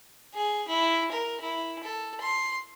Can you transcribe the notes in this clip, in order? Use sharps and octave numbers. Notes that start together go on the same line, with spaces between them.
G#4
E4
A#4
E4
A4
C6